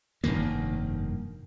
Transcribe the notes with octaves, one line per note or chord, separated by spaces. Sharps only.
F1 G2 D#3 A#3